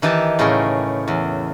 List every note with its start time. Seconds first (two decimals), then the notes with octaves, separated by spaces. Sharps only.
0.02 D#3 E3 D#4 G4 A5
0.39 A2 C#3 G#4 A#4 G5
1.08 E2